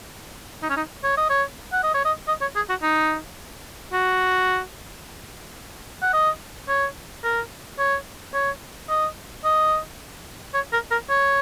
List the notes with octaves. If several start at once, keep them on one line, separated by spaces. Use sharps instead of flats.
D#4
C#4
D#4
C#5
D#5
C#5
F#5
D#5
C#5
D#5
D#5
C#5
G#4
F#4
D#4
F#4
F#5
D#5
C#5
A#4
C#5
C#5
D#5
D#5
C#5
A#4
A#4
C#5